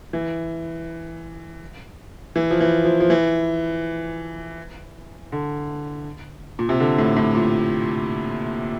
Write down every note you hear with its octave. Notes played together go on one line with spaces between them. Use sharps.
E3
E3
F3
E3
F3
F3
E3
D3
A#2
C3
D3
A2
A2
A#2